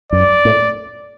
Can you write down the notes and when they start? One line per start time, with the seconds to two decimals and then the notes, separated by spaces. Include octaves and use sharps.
0.12 F#2 D5
0.45 A2